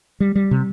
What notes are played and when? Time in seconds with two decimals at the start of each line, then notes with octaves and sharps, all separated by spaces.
0.20 G3
0.35 G3
0.51 C3